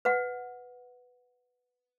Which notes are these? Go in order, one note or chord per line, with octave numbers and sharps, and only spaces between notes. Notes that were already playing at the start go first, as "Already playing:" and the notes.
B4 F#5